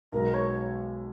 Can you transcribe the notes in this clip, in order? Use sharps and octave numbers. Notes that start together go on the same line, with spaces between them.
B1 B2 G#3 A#4
C#5